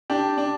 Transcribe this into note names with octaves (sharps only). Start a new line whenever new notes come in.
D4 G4
D4